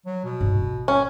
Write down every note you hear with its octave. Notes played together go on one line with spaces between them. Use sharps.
F#3
B2
G2 D#4
G#1
C#4